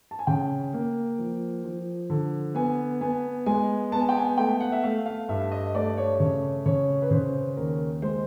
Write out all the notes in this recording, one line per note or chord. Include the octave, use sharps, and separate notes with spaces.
A5
G#5
C#3 G5
A#3
F3
F3
D3
B3 G#5
B3 G#5
G#3 G#5
B3 A5
G#5
G5
G#5
A3 G5
F#5
E5
A3 F5
F5
G2 E5
D#5
A3 D5
C#5
C#3 C#5
C#3 C#5
B4
C#3 C5
D#2 A#4
G#3 C5